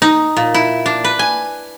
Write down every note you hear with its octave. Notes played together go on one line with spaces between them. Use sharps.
D#4
A#2
E4
D4
B4
G#5